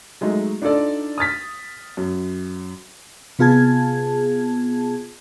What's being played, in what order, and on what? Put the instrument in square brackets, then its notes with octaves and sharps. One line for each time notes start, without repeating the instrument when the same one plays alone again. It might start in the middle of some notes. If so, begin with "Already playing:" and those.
[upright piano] F#3 G#3 A3 D#4
D4 D#4 F4 A4 D5
D#6 F6 A6 B6
F#2
[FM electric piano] C3 B3 F4 G#4 A5 G#6